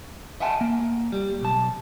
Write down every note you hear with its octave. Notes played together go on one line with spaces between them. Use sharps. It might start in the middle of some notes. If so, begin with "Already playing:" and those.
D#5 E5 F#5 G#5 A5
A#3
G3
B1 A5